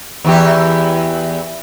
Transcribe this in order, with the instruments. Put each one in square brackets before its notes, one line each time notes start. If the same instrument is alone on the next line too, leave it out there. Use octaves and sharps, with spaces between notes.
[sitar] E2 E3 G4